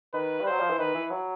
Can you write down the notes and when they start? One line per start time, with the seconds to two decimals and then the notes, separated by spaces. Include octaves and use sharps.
0.13 D#3 B4
0.41 G3
0.46 F#3 C5
0.60 F3
0.70 E3
0.79 D#3 B4
0.95 E3
1.10 F#3